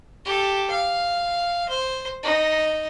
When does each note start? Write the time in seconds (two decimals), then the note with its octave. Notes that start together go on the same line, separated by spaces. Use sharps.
0.25 G4 A4
0.70 F5
1.69 C5
2.24 D#4